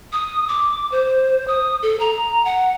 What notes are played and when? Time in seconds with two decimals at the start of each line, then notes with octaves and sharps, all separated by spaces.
0.12 D#6
0.49 D6
0.92 C5
1.48 D#6
1.83 A4
2.00 A#5
2.45 F#5